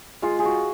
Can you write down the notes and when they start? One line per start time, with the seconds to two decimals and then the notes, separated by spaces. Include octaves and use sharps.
0.22 G#3 F4
0.39 G#4
0.45 F#4